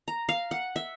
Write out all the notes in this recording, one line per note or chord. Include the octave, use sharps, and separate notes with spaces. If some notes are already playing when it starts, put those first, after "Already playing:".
A#5
F5
F#5
E5